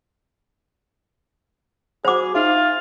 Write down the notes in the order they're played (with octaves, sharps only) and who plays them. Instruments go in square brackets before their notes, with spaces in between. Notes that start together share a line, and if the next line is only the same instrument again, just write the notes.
[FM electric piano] F#4 F#5 B5 [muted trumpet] G#4 [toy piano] C5 D6
[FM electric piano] D#4 E5 [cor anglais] F4 [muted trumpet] F5